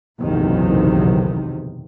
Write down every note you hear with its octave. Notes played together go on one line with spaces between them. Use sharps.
F#1 B1 E2 C3 D#3